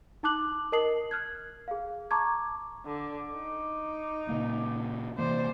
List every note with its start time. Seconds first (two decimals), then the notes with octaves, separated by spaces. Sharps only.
0.23 D#4 A5 D6 F#6 F#7
0.72 A#4 D#5 A5 D#6 C7 F#7
1.11 F6 F#6 G#6
1.68 G#4 F5
2.11 A5 A#5 C#6 D6 G#6
2.85 D3 D6
3.34 D#4
4.29 A#2 C#3 A#3
5.18 C3 E3 A#3 C5 D5